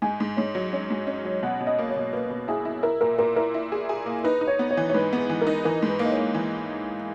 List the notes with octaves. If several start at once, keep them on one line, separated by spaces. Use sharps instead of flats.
G#2 G#5
G#2
G#2 C#5
F#3
C#4 D#5
G#2
C#4
F#3
B2 F#5
B2
D#5
A#3
C#5
B2
A#3 B4
B2
E4 G#4
E4
E4 A#4
A#2 A#4
A#2 A#4
E4 A#4
E4
G#4
G#4
A#3
D#4 B4
D#4
C#5
B3
C#5
E3
C#5
G#2 B4
B3
B4
E3
A#4
D#4
E3 A#4
G#2
B4
A#3
D#5
C#5
A#3
E3